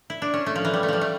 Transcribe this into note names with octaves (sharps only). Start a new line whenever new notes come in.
E4
D4
C#4
A3
F3
E3
G3
A3
F3 G3
A3